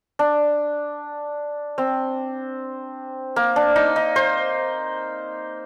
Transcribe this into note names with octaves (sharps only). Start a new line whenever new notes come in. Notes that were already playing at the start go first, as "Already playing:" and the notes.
D4
C4
A#3
D4
D#4
D#4
C5